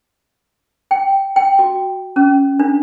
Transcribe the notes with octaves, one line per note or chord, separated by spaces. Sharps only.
G5
G5
F#4
C#4
D4